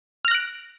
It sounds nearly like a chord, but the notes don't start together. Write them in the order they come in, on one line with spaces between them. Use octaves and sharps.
F6 A#6 F#6 D7